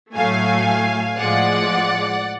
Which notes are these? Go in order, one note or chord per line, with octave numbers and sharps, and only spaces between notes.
A2 F#3 A3 F5 G#5
A2 F3 G#3 D5 F#5